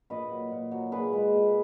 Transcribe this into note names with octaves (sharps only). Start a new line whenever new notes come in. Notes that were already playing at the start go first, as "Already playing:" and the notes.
A#2 B4 D#5
F#3
A#2
F#3
A#2 G#4 B4
G#3
A#2